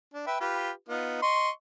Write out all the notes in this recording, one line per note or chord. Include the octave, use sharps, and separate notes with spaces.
D4
B4 E5 G5
F4 G4 B4
B3 D#4 F4
D#5 C6 C#6